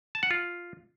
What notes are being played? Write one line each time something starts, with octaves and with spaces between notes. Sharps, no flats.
A5
F#5
F4